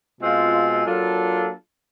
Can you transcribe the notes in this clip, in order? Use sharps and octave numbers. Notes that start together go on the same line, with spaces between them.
B2 G#3 C4 F4
F#3 A#3 D4 F4 A4